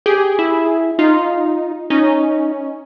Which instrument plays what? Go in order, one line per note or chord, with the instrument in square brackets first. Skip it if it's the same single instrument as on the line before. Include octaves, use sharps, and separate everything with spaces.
[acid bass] G4 [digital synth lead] G#4
[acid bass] E4
[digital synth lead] D#4 [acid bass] F4
[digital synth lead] C#4 [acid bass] D#4